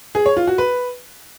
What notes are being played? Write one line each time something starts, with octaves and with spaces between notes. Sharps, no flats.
G#4
C#5
F4
F#4
B4